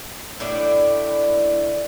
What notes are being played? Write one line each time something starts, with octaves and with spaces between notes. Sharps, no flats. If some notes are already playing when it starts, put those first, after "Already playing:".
A2 D4 E4 D5